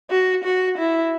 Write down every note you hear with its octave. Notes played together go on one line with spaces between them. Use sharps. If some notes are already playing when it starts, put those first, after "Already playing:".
F#4
F#4
E4